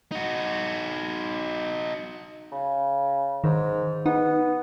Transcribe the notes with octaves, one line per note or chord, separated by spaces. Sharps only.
D#4 F#4
C#3
G#2 D#3
B3 D#4